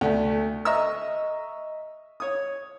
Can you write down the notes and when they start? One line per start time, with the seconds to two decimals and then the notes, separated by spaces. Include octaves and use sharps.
0.01 D2 A3
0.65 D#5 E5 A#5 C#6 D#6 E6
2.20 C#5 D#6